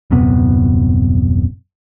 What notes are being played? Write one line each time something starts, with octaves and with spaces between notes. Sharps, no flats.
D#1 F#2 C3 B3